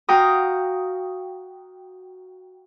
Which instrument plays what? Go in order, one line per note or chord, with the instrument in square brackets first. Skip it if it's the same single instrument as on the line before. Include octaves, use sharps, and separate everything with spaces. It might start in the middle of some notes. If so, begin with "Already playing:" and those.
[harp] F#4 F5 G5 A#5 D#6